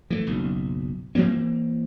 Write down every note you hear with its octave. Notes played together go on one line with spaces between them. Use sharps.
E3 A3
F#1 B1
E3 F#3 A#3 C4